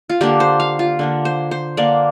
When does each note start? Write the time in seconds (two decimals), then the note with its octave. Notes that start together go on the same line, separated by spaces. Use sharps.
0.09 F4
0.21 D3 A#3 D4 G4
0.40 C5
0.60 F5
0.79 F4
0.99 D3 A#3 D4
1.25 C5
1.51 C5
1.77 D3 A#3 D4 D5